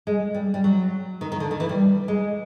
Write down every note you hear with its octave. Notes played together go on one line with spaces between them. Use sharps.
G#3
G3
G3
F#3
D#3
D#3
D3
D#3
E3
G3
G#3